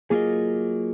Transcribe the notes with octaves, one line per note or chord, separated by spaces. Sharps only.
F#3 A#3 F4 G#4 A#4 D#5